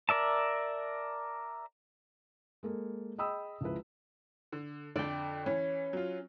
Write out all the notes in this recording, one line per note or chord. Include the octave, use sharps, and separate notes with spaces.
A#4 D5 E5 A5
G#3 A#3 A4
G#4 D#5 G5 B5 D#6 E6
C#2 F3 G#3 E4 B4
D3
F2 D3 D5 G5
E3 C#4
F#3 F4